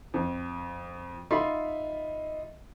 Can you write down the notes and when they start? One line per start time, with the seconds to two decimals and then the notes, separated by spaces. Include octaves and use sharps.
0.14 F2
1.31 D#4 F4 E5 B5 C6